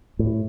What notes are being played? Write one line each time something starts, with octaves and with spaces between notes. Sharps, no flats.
A2